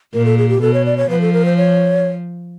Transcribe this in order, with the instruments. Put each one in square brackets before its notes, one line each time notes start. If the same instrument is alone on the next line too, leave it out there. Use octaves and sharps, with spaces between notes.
[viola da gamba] A#2 [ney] A#4
[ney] A4
G#4
G4
[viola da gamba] B2 [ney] A4
[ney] C#5
D5
C#5
[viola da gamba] F3 [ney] B4
[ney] A4
A#4
C5
C#5